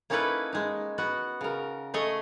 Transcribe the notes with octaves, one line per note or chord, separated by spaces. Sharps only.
A#3 C#4 D#4 E4 A4 B4
G#3 D#4
B3 F#4 F#5
C#3 A#4
A3 G#4 C#5 D#5